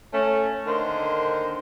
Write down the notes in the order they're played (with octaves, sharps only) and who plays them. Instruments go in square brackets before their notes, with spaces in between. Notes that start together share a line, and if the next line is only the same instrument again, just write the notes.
[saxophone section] A3 C#4
D3 D#3 A#3 C5